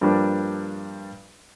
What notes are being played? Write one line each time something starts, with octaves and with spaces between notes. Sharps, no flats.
G2 F3 G3 A#3 D4